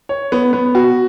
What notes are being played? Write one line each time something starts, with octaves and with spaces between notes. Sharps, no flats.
C#5
B3
B3
F#4